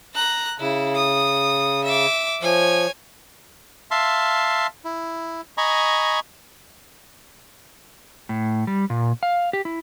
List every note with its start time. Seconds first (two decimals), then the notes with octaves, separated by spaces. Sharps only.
0.14 A#5 F#6
0.59 C#3 E4
0.95 D#6
1.84 E5 D6
2.42 F3 C#5 G#5
3.91 E5 F5 A5 C6
4.85 E4
5.57 D#5 G#5 A#5 B5 C#6
8.29 A2
8.67 G3
8.90 A#2
9.23 F5
9.53 G4
9.65 E4